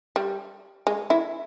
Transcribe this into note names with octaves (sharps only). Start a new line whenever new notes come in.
G3
G#3
E3 E4